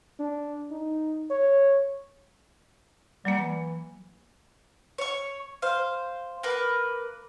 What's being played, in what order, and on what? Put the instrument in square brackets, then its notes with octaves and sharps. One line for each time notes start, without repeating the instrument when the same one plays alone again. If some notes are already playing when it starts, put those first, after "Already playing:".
[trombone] D4
D#4
C#5
[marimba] F#3 A#3 [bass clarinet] G3
[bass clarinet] E3
[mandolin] C#5 C#6
C5 F5
A#3 A#4 B4